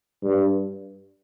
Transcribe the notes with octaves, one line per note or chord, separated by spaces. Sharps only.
G2